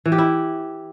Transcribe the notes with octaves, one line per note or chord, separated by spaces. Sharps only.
E3
G4
E4